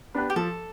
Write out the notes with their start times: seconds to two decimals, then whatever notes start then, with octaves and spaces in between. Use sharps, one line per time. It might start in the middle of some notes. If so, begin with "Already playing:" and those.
0.14 B3 D4 G4 B4
0.30 G4
0.36 F3 A4